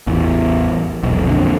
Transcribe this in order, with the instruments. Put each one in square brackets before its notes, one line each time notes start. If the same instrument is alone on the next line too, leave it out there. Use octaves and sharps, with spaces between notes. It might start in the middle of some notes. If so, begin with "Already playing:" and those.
[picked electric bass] A1 E2
E1 B1
F2 D3